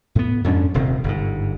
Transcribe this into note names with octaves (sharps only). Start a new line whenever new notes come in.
A2 B3
F2 G#2 C#4 D4
D#1 C3 D#3
G1 G#2